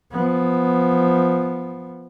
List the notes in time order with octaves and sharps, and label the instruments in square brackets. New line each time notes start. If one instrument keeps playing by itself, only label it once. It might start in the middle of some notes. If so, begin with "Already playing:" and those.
[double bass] F3 B3